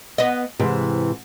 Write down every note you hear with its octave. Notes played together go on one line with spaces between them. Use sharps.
B3 D#5
G#2 C3 E3